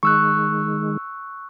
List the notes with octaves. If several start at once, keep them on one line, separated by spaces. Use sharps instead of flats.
D#3 G#3 C#6 E6 F#6